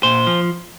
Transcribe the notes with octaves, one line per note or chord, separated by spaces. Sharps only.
A#2 C5
F3